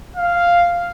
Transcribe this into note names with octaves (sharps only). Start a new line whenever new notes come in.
F5